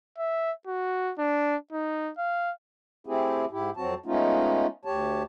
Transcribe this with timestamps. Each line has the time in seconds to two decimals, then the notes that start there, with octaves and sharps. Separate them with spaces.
0.18 E5
0.67 F#4
1.18 D4
1.72 D#4
2.18 F5
3.06 A3 C4 E4 G4 G#4
3.51 G#2 E4 G4
3.77 F2 F#3 C4 F#4 A5
4.06 G#3 A3 B3 C#4 D#4 F4
4.85 D2 G4 C#5 A5